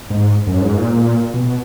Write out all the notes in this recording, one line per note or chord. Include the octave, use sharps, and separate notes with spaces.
G#2
F#2
G#2
A#2
A#2
B2